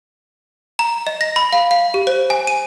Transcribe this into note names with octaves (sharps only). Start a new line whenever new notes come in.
A#5
D#5
A#6
B5
F5
F5
G4
C5
G#5
D#7